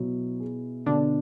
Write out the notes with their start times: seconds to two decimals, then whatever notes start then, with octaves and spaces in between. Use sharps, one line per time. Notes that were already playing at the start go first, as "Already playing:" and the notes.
Already playing: B2 F#3 E4
0.40 G#4
0.86 B2 D3 D4